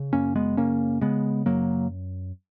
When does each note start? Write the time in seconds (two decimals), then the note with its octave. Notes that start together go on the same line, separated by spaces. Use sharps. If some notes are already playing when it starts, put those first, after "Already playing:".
Already playing: C#3
0.13 F#2 A#3 C#4
0.36 G#3 B3
0.57 C#3 A#3 C#4
1.01 C#3 G#3 B3
1.46 F#2 F#3 A#3